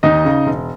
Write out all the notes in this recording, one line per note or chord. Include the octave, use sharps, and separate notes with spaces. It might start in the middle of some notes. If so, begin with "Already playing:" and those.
D#2 D#4 D#5
C#3
E1